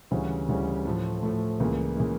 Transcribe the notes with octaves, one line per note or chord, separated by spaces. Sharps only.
D2 C#3 E3 G3 C#4
D2 C#3 E3 G3 C#4
A2 F3 A3
A2 F3 A3
C#2 C#3 E3 A#3
C#3 E3 A#3